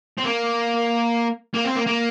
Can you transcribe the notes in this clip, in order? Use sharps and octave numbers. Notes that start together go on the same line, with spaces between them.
C4
A#3
A#3
C4
A#3
A#3